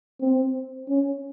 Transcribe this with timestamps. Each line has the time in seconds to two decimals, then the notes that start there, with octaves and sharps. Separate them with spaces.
0.21 C4
0.89 C#4